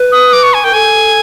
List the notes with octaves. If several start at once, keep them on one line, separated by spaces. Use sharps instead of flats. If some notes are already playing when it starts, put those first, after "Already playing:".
Already playing: B4
D#6
D6
C#6
G#5
A#4 G5
A4 G#5